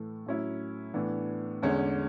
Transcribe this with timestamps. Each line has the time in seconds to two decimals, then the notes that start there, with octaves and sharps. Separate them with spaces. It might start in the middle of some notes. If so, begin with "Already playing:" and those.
Already playing: A2 E3 A3
0.26 A2 F#3 C#4 E4
0.94 A2 E3 B3 D4
1.62 E2 D3 G#3 C#4